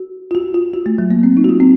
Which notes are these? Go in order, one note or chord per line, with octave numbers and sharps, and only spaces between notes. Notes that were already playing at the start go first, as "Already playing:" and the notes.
Already playing: F#4
F4
F#4
F4
F#4
A3
F#3
A#3
C4
D#4
F#4
F4
C4